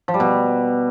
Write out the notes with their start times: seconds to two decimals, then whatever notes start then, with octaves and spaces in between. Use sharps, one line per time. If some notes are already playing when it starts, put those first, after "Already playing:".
0.08 F3
0.14 G3
0.20 B2